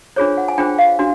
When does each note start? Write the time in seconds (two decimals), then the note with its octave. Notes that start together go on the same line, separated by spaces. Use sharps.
0.16 D4 F4 G#4 C5 C#5
0.37 F#5
0.48 G#5
0.58 D4 F4 G#4 C5 G5
0.78 F5
0.99 D4 F#4